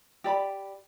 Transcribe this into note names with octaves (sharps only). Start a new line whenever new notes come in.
G4 D5 A#5 B5